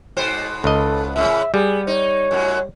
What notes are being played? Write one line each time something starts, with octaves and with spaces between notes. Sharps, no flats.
G#2 B2 C5
C#2 A4 D#5
A2 C#3 E5
G3 B3 G#4
D#4 C#5
F#2 A2 F#3